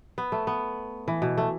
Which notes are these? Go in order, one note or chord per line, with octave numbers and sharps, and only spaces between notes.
B3
A3
B3
E3
B2
A3